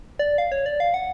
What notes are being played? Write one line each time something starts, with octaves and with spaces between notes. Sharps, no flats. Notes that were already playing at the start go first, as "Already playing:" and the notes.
D5
F5
C#5
D5
F5
F#5